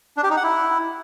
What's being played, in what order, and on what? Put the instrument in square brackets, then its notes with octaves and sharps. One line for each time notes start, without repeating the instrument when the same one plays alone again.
[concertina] D4
G4
D#4
F#5
E4